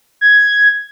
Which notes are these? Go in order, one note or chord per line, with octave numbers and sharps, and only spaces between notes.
G#6